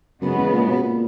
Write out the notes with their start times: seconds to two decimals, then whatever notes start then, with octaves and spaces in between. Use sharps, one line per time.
0.22 F#2 C#3 G#3 B3
0.37 E2
0.53 A#2
0.68 B2
0.83 A#2